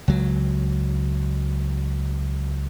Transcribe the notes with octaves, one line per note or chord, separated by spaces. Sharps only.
C#2 F#3